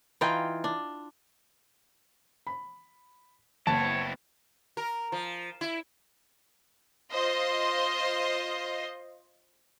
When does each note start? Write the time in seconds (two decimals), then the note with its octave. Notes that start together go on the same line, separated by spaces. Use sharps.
0.21 E3 D#4 F4 G5
0.64 D4
2.47 B5
3.67 F#1 B3 C4 E4 C#5 A5
4.77 A#4
5.12 F3
5.61 E4
7.12 F4 C5 D#5 C6